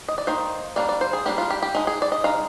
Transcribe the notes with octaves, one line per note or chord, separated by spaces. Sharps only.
D#5
D5
D#3 A#3 D#4 C5
G3 A#3 D4 D5
D5
C5
G#4
G3 A#3 D4 G4
F4
G4
G4
G#3 D#4 G#4
G#4
D5
D#5
G#3 D#4 F5